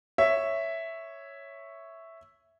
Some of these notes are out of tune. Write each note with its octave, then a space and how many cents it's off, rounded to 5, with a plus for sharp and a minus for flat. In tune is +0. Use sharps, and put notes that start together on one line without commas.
C#5 +0 E5 +0